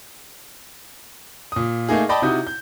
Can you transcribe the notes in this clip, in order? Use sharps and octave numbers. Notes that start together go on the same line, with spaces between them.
A#2 D#6
A3 A#3 D#4 G#4
D5 D#5 G5 A5 B5
C3 D#4 E4 F#4 D#6 G6
G6